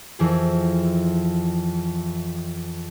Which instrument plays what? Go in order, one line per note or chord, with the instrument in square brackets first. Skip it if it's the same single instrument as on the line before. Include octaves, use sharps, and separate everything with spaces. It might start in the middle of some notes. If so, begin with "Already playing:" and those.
[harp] F2 E3 G#4